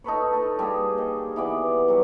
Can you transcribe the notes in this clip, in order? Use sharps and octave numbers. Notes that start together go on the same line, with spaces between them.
D#4 A4 B4 C#5
A4 B4
G3 A#3 G4 G#4
D#3
E3 B3 D5
F#3 G3